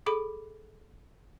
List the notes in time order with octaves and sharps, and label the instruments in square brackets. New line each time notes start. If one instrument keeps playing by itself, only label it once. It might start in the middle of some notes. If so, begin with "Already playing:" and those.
[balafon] G#4 A4 B5 D6